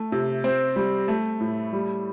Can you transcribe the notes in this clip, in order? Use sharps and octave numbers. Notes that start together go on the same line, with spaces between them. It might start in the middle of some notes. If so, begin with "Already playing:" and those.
Already playing: A3
C3
C4
G3
A3
A2
G3